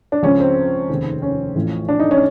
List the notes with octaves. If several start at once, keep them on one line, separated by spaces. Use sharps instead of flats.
D4
C#2 C#3 F3 C#4
C4
F1 D#2 C#3
C#4
A1 A2 F3
D4
D#4
C#4